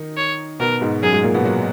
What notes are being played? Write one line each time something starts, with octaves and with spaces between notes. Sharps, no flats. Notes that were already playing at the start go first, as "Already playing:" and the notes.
Already playing: D#3 D#4
C#5
B2 B3 A#4
G#2 G#3
F#2 F#3 G#4
G#2 G#3
A#2 A#3
B2 B3
F#3 F#4